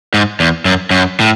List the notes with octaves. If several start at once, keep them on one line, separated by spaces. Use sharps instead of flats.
G#2
E2
F#2
F#2
A2